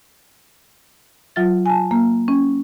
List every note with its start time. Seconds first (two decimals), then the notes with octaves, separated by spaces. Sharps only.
1.36 F#3 F4 E5 A6
1.66 G#5 A5
1.91 A#3
2.28 C#4